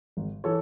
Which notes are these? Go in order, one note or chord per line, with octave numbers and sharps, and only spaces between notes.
G#1
E3 A4 C#5